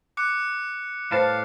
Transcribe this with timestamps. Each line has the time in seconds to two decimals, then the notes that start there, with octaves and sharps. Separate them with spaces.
0.17 D6 F#6 C#7
1.12 A2 G3 B4 C5 F5 A5 B5